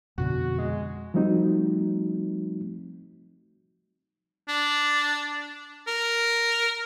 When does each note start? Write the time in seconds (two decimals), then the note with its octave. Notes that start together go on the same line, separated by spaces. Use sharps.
0.18 F2 B2 D3 F#4
0.58 G#3
1.14 F3 G3 A3 C4 D#4 F#4
4.48 D4
5.87 A#4